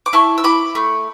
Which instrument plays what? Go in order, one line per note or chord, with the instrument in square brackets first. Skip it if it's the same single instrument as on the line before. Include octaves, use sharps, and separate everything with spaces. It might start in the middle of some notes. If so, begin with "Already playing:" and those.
[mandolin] D6
E4 A5 C#6
E6
E4 B5 D6
A3